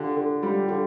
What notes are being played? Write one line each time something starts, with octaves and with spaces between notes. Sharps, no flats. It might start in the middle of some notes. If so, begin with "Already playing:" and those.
Already playing: D3 F4 G4
D3
G3 F4 G4
D3 F4 G4